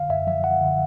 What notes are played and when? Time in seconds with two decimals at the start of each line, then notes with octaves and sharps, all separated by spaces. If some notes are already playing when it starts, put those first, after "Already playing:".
Already playing: F2 D3 F5
0.09 F#2 E5
0.27 F3 E5
0.44 F#2 F#5
0.61 D3